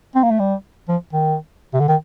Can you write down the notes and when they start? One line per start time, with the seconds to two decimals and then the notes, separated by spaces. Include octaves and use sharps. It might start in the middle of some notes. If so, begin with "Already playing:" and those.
0.15 C4
0.23 A#3
0.31 A3
0.39 G3
0.89 F3
1.13 D#3
1.74 C3
1.80 D3
1.88 D#3